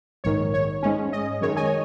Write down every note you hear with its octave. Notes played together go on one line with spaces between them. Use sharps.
A#1 G#2 D#3 C#5
C#5
G#2 G#3 C#4
D#5
F#2 D#3 G#3 C#5
D#5 G#5
C#5